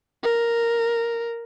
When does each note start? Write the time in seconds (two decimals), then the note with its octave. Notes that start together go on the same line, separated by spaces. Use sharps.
0.24 A#4